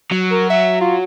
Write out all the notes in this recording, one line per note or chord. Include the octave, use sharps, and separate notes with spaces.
F#3
A#4
E5
F4